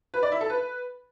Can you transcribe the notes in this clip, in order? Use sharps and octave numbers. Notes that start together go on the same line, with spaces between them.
B4
D5
E4
A4
B4